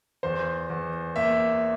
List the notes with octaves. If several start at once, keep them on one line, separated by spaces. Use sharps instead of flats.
E2 C5
E2
A#3 E5